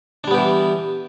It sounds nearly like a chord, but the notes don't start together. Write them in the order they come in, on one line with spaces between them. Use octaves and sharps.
D4 G3 B3 G4 E3